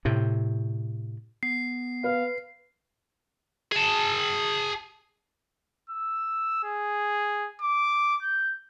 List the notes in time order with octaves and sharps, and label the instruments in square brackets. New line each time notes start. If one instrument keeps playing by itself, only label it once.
[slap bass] A2 C3
[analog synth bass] B3 [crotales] C7
[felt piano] B4 [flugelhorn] F5
[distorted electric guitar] G#4 A5
[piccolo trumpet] E6
G#4
D6
G6